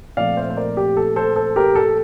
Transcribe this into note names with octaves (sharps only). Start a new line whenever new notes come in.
A#2 F3 A3 C4 D5 F5
C5 E5
C5
A#4 D5
G4
A4
A4 C5
A4 C5
G4 A#4
A4